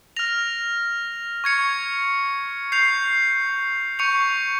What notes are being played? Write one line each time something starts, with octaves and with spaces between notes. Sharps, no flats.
F6 A#6 F7
C#6 G#6 C#7
G6 C7 F7
C#6 G6 C#7 F7